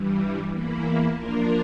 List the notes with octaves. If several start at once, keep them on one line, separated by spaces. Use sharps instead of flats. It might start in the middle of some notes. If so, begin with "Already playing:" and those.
Already playing: G2 E3 G3
E2 E3 A#3 E4
F3 A#3 D4 F4 A#4